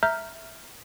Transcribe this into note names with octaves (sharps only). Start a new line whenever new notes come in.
E5 A#5 F6 G6